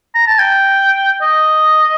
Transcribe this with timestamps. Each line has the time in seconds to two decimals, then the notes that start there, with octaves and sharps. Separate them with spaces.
0.15 A#5
0.27 A5
0.39 G5
1.22 D#5